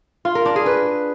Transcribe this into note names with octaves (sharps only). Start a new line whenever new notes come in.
F4
A#4
D4
G#4
B4